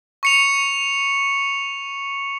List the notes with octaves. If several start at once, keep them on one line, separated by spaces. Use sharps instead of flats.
C#6 C#7 F7